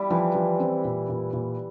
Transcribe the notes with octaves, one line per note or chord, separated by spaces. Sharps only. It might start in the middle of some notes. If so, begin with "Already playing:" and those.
Already playing: G3 E4
E3 F3
F3
C4
A#2
A#2
A#2